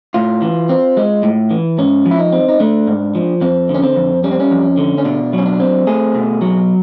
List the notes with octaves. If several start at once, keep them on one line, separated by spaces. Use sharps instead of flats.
A2 F4
E3
C4
G#3
A2
E3
G#2 C#4
F3
E4
D#4
C4
D#4
A3 D4
G#2
F3
F2 C4
D3
C#4
C4
F2
G3 C#4
C4
C#4
F2
D3
C#4
B2 D4
F#3
C#4
D4
C4
A3 G#4
B2
F#3